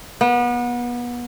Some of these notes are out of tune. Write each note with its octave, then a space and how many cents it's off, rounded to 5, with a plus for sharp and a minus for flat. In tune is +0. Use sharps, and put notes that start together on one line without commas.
B3 -30